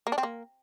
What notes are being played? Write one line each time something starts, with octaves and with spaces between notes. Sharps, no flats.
A#3
D4
C4
A#3